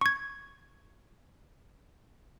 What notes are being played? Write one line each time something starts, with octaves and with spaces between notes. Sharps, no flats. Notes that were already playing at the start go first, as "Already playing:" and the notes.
C#6 G#6